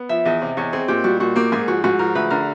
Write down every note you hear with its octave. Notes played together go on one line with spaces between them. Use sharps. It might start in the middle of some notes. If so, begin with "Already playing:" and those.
Already playing: B3
F3 E5
E2 D#5
C3
E2 C#5
C4 G#4
A#2 G4
G3 F#4
A#2 F#4
A#3 G4
G#2 G#4
F3 F#4
G#2 F#4
F3 A#4
D2 B4
D3 A#4